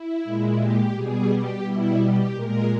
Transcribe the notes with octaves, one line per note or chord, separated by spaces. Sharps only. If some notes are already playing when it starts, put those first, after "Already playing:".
Already playing: E4
A#2 G#3
G4
B2 G3 G#4
G4
B2 G3 E4
G4
A#2 G#3 A#4